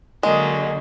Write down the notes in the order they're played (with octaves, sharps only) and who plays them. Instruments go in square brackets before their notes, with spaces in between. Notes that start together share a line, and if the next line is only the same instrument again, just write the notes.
[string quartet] D3 F#3 [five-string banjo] G#3 [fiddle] A#3 [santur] D#5